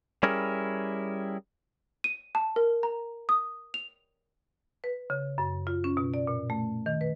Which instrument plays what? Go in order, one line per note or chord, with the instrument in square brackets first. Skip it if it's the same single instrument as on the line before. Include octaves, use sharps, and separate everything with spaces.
[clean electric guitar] G3 C#4 E4 G#4 A#4
[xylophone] D#7
A5
A#4
A#5
D#6
F7
[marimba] B4
C#3
F#2
F4
C#4
B2
D5
A#2
A3
D#3
B4